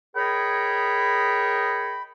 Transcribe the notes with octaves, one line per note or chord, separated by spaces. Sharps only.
G#4 A#4 C#5 D#5 G5 B5